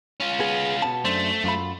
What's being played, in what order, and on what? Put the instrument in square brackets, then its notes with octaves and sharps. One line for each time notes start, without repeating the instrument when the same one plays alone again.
[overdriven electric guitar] C#4 F4
[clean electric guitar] B3 G#4
B2 B3 A5
[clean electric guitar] F#2 D4 C5 [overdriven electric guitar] A3
[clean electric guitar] F#2 F4 B5